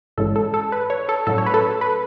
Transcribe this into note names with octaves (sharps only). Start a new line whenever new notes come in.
G#1 G#2 E3 G#3 C#4 A4
A4
A4
B4
C#5
A4
A2 F#3 A3 C#4 A4
C#5
B4
A4
B4